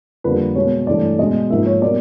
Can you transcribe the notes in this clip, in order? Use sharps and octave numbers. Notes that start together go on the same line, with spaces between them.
F2 D3 G3 A#3 B4
B2 G#3 C#5
G2 E3 A3 D5
B2 G#3 D#5
G#2 F3 A#3 E5
C#5
B2 G3 A#3 D5